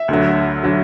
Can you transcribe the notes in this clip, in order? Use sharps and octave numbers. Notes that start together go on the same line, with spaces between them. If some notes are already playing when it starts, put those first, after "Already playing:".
Already playing: E5
D2 D3 F#3
D3 F#3